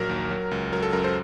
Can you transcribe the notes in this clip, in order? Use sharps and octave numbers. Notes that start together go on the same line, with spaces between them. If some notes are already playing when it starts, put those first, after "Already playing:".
Already playing: A#1 F#3 A#4
D#2
F#3
C#2
F#3 A#4
A4
F#2 A#4
A4 C5